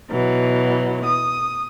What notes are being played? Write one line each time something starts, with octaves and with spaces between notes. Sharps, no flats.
B2 E3 F#3
D#6